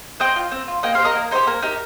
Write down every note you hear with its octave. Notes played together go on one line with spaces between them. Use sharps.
C4 D#5 G5
F4
C4
F4
A#3 D#5 G5
G4 C5 F5
D#4 A#4 D#5
A#3
D#4 G4 C5
A#3 A#4
D#4 G4